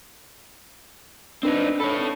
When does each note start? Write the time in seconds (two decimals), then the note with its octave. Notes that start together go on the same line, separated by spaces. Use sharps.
1.43 C4 D4 D#4 B4
1.80 A4 C#5 B5